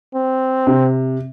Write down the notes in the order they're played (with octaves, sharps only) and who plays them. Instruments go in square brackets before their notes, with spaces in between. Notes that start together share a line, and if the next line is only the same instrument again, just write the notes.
[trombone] C4
[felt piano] C3